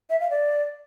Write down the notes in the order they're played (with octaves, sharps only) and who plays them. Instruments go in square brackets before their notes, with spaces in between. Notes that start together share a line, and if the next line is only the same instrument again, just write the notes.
[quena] E5
F5
D5